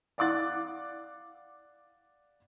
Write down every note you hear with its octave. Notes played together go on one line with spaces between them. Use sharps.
D5 F5 F#5 D6 F#6 A6